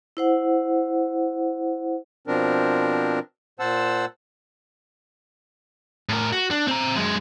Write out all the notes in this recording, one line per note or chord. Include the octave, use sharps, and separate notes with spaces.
E4 C5 F#5
B2 F3 C4 D4 A#4
A#2 C5 F#5 A5 E6
A2 A#4
F#4
D4
C4 A#5
F#2 G#3